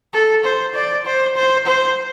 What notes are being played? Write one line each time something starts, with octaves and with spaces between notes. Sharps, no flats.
A4
C5
D5
C5
C5
C5